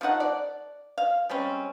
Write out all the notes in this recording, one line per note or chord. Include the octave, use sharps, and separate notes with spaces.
F3 A3 D#4 F#5
D5
F5
G3 G#3 C4 C#4